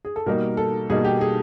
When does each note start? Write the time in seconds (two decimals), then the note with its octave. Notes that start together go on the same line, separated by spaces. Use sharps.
0.05 G#4
0.16 A4
0.26 B2 G3 A#3 D#4 A#4
0.57 A4
0.89 B2 G3 A#3 D#4 G#4
1.05 G4
1.21 G#4